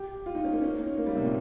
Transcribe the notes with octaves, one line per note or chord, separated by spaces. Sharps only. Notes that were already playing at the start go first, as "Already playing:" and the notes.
Already playing: G4
F4
D#4
C#4
A#3
C#4
D#4
A#3
G3
C3
A#2